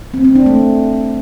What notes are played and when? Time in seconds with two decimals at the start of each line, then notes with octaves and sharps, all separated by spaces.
0.14 C4
0.25 C4
0.35 D4
0.46 A3